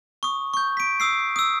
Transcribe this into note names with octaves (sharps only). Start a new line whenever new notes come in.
C#6 D#6
C#6 G6
B6 D7
D#6 E6 C7
D#6 E6